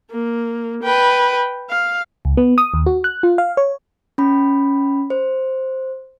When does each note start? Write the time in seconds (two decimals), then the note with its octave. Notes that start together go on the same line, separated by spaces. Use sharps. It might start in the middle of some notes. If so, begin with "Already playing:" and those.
0.11 A#3
0.84 B4 G5
1.70 F5
2.25 C#2
2.37 B3
2.58 D#6
2.74 D#2
2.86 F#4
3.04 F#6
3.23 F4
3.38 F5
3.57 C#5
4.18 C#4 B5
5.10 C5